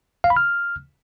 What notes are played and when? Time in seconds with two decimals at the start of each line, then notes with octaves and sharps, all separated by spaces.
0.24 F5
0.30 B5
0.37 F6